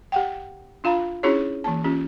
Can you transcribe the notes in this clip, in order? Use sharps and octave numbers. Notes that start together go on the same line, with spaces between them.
G4 F#5 G5
D4 F4 F5 A#5 B5
C#4 D4 E4 F#4 G#4 C#5
E3 A#3 A5
C#4 F4 G4